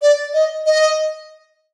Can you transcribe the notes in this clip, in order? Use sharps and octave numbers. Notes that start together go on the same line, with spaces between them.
D5
D#5
D#5